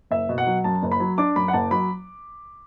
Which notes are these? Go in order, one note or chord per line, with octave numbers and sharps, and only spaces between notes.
F#1 E5
B2
F#5
F#3
F#2 A5
F#1
B5
F#3
D4 D6
F#2 B5
F#5
F#1 A5
F#3 B5